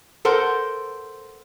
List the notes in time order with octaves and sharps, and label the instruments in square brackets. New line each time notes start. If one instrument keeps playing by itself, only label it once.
[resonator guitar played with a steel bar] A4 A#4 C5 F#5